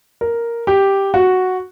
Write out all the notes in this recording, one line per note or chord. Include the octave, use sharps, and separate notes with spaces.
A#4
G4
F#4